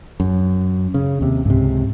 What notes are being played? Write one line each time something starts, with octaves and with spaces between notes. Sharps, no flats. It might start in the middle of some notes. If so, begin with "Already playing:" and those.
F#2
C#3
D#2 C3
C#2 G#2 C3